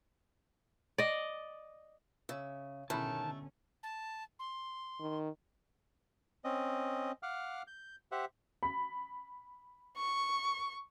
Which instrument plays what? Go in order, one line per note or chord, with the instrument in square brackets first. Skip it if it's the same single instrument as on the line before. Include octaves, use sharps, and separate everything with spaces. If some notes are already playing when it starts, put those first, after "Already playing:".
[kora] D5 D#5
[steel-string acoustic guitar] C#3 [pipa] E5
[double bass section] B2 D3 C#4 [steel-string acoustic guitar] D#3 [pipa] G#3 A3 E4 [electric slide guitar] A5
[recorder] A5
C6
[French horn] D#3
[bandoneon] C4 C#4 D#5
F5 F#5 D6 F6
G6
G4 C5 E5 F#5
[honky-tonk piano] B5
[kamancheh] C#6